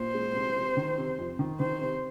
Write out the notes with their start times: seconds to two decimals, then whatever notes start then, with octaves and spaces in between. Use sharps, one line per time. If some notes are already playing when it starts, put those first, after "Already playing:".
Already playing: A#2 C5
0.14 G#3
0.35 C3
0.56 C3
0.77 D#3
0.98 C3
1.18 F2
1.39 D#3
1.60 D#3 C5
1.81 C3